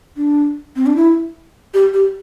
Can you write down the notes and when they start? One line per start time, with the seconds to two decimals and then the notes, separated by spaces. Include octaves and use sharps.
0.17 D4
0.76 C4
0.86 D4
0.96 E4
1.74 G4
1.94 G4